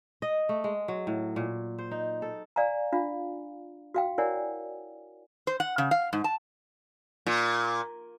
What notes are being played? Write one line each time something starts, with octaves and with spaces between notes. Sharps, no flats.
D#5
A3
G#3
F#3
A2
A#2
C5
D#4
A4
D5 F5 G#5 A#5
D4 F4 F5
F#4 F5 G5
E4 A#4 C#5 D5 F#5 G#5
C5
F#5
C#3
F5
G#2
A5
A#2